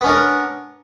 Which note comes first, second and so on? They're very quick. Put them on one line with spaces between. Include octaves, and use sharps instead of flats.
B3 C#4 D4 A#4